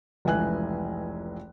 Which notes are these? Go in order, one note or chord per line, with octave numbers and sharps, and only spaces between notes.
F1 C#2 E3 G#5 F#6